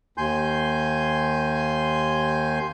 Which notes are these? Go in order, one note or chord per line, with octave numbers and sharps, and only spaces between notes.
D#2 G#5 C6 G6